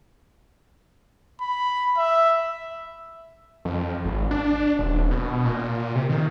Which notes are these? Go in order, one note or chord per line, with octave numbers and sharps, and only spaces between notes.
B5
E5
F2
G#1
D4
D#1
B2
A#2
C3
D#3